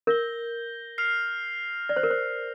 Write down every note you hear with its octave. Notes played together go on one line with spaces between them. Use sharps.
A#4 G6 A#6 G7
F6 C7 F7
C5 D5 A#6 G7
A#4
C5